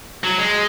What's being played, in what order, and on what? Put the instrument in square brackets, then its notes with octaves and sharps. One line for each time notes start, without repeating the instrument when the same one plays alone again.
[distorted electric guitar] F#3
G#3